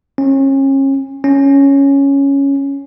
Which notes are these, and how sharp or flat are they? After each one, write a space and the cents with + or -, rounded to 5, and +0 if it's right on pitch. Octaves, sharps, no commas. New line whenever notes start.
C#4 -35
C#4 +0